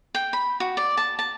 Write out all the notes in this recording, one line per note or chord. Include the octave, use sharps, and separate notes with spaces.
G5
B5
F#4
D5
A5
A5